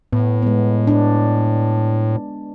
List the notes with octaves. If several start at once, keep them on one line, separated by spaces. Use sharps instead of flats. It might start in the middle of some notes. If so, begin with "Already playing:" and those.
A2 B3
G#3 B3
D4